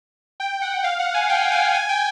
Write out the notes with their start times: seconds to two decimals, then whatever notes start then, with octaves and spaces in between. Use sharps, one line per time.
0.40 G5
0.62 F#5
0.84 F5
0.99 F#5
1.14 G#5
1.29 G5
1.52 G#5
1.74 G#5
1.89 G5